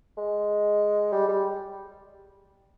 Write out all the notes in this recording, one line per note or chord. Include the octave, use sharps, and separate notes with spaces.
G#3
G3
G3